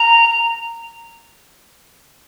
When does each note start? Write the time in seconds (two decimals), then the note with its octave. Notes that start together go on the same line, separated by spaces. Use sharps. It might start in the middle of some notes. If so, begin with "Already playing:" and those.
Already playing: A#5